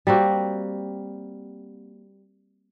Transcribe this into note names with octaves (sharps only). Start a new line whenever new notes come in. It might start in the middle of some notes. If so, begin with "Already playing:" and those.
G3 A#3 C4 F#4